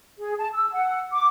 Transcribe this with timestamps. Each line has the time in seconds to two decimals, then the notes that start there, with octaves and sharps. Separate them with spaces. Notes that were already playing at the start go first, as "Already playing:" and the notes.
0.19 G#4
0.39 A5
0.54 E6
0.73 F#5
1.13 D6